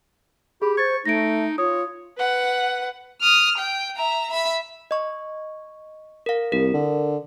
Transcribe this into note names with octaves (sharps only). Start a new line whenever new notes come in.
G4 G#4 B5
C5 C#6 G#6 A6
A3 D#4 A#6 D7
F4 C#5 D#6
B4 F#5
D#6 F6
G5
E5 A#5
E5 B5
D#5 C#6
A#4 F5
C2 A#4
D3